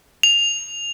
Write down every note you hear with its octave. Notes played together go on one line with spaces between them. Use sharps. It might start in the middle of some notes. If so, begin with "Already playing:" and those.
F7